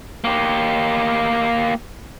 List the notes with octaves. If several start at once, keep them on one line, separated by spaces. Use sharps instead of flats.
A#3 G4